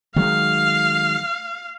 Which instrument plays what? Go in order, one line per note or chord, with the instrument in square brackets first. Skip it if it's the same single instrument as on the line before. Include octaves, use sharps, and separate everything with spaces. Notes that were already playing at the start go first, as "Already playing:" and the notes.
[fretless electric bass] D#3 F#3 G#3 [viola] F5